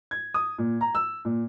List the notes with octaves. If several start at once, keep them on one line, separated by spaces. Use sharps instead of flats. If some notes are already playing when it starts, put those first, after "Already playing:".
G#6
D#6
A#2
A#5
E6
A#2